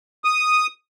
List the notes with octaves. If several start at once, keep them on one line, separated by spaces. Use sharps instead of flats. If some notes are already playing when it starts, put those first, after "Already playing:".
D#6